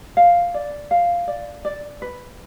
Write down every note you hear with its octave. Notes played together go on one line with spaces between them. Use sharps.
F5
D5
F5
D5
D5
B4